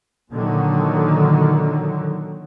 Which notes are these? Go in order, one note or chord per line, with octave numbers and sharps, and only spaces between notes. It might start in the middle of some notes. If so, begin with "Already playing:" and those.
A#2 D3 D#3 F#3